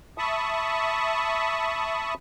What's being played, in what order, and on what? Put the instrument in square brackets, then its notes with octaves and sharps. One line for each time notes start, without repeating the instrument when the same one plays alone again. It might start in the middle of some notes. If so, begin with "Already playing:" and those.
[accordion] E5 A5 B5 C#6 D#6